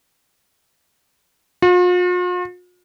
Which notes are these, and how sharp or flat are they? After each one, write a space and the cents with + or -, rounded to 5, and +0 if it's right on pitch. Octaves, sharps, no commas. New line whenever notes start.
F4 +45